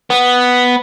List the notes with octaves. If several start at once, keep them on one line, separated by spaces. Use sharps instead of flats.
B3